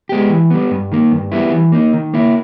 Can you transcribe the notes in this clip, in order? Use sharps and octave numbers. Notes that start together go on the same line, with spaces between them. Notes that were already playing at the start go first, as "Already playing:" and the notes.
G#3 B3 G4
E3
G3 B3
G2
D#3 A#3
G2
G3 B3 E4
E3
A#3 D#4
D#3
A#3 E4